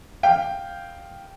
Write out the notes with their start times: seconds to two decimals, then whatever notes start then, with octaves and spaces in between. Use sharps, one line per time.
0.23 F5 G5